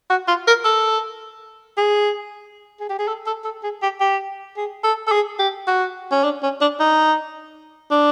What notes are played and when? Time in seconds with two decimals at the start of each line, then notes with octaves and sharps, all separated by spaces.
0.10 F#4
0.28 F4
0.47 A#4
0.65 A4
1.77 G#4
2.80 G#4
2.89 G4
2.99 G#4
3.08 A4
3.27 A4
3.44 A4
3.63 G#4
3.82 G4
4.00 G4
4.57 G#4
4.84 A4
5.07 A4
5.12 G#4
5.39 G4
5.67 F#4
6.12 C#4
6.24 D4
6.43 C#4
6.61 D4
6.80 D#4
7.91 D4